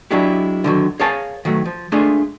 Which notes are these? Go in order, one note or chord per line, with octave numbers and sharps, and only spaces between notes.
F#3 G#3 D4 E4 G4
D3 D#3 F#3
G#4 A#4 C#5 F5 G#5 A5
D#3 F#3 A3
F3
G#3 A3 D4 F4 G#4